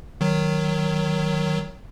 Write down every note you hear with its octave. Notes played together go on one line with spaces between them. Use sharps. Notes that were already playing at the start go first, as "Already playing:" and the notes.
D#3 F#3